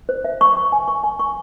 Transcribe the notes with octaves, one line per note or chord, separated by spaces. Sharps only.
C5
E5
C#6
C#6
G#5
C#6
G#5
C#6